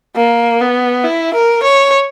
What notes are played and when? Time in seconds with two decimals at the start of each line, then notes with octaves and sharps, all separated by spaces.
0.16 A#3
0.61 B3
1.04 E4
1.35 A#4
1.63 C#5